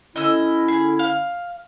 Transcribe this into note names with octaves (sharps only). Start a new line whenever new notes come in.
D3 C#4 E4 D#5 E6
G#4
F5